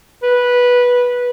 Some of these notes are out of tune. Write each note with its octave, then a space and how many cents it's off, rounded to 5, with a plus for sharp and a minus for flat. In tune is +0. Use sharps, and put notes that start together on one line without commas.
B4 -10